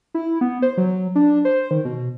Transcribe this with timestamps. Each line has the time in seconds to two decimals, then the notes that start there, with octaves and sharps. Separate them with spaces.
0.14 E4
0.41 B3
0.62 C5
0.77 F#3
1.15 D4
1.45 C5
1.71 D#3
1.85 B2